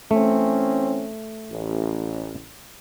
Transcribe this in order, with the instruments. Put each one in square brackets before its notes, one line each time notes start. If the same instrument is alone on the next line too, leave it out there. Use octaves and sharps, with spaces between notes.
[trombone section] E3 C4 C#4 [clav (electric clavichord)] A3
[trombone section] A1